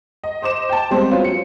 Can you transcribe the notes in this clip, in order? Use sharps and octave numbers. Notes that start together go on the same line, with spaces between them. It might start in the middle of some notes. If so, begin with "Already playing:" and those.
D#5
C5 D#5 D6 E7
G5 A5
G3 G#3 B3 C4 C5
F#3 B3 C#4 F4
C#7